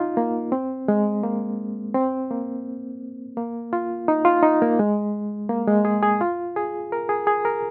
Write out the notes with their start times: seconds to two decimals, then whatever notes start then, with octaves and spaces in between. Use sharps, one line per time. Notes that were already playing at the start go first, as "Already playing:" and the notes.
Already playing: D#4 F4
0.17 A#3
0.52 C4
0.88 G#3
1.23 A#3
1.94 C4
2.31 A#3
3.37 A#3
3.73 F4
4.08 D#4
4.25 F4
4.43 D#4
4.62 A#3
4.79 G#3
5.49 A#3
5.68 G#3
5.85 G#4
6.03 G#4
6.21 F4
6.56 G#4
6.92 A#4
7.09 G#4
7.27 G#4
7.45 A#4